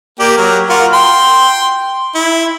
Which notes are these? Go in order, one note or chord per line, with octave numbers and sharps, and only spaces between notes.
A#3 G4 D5
F#3 A#4
F4 F#4 A#4
G5 C6
E4